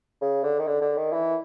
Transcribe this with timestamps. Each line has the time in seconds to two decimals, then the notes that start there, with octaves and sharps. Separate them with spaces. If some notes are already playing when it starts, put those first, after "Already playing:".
0.21 C#3
0.44 D3
0.59 D#3
0.67 D3
0.81 D3
0.97 D#3
1.13 E3